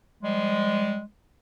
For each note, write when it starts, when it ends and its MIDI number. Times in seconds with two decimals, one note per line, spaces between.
0.22 1.02 53
0.22 1.02 55
0.22 1.02 56